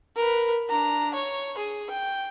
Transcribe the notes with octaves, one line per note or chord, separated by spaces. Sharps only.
A#4 B4
D4 A#5
C#5
G#4
G5